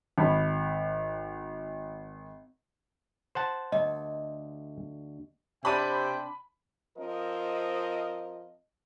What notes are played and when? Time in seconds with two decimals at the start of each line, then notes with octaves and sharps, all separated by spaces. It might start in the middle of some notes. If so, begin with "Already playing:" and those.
0.18 G#1 B5
3.35 C5 F#5 A5
3.72 D2 D#5
5.65 C3 D4 C5 E5 G5 A#5 B5 D#7
6.98 F3 C4 A#4 D#5